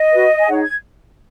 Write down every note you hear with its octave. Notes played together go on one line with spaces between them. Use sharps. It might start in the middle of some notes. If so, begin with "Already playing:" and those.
Already playing: D#5
F#4 B4
G#5
D#4 G#4 C#5 F#5
G#6